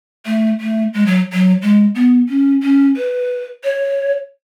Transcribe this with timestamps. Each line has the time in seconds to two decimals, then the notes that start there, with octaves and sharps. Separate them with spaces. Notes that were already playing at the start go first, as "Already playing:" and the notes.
0.26 A3
0.61 A3
0.94 G#3
1.06 F#3
1.33 F#3
1.62 G#3
1.95 B3
2.29 C#4
2.63 C#4
2.97 B4
3.64 C#5